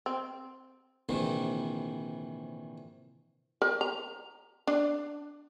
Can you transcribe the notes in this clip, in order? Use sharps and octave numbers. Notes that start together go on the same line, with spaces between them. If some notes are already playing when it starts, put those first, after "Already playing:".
C4
A#1 C3 D#3 E3
A#4
A#5
D4